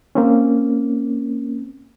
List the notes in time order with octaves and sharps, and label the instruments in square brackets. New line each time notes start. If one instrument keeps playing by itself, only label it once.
[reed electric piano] A#3 C4 C#4